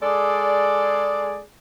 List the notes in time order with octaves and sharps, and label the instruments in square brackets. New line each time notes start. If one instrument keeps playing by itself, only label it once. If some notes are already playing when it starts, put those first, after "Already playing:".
[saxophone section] G#3 G#4 A4 D5